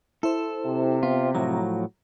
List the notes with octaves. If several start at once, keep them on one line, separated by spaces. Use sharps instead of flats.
E4 A4 C5
C3
B3 F4
A2 F3 F#3 A#5